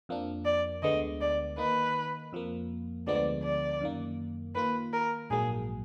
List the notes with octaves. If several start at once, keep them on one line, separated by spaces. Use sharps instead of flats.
F2 F3 A#3 D4
D5
D2 D3 G#3 B3 D#5
D5
D#3 A#3 D#4 B4
F2 F3 A#3
D2 D3 F3 G#3 B3 D5
D5
F#2 D#3 A#3
D#3 A#3 F4 B4
A#4
A#1 G#2 F#3 A#3 G#4